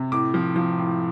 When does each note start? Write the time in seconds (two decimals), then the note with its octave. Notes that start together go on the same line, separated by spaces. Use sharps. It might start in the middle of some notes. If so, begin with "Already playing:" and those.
Already playing: C3
0.12 A2 D6
0.34 F3
0.56 F3
0.78 A2